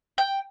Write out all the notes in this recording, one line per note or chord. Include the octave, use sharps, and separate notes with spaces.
G5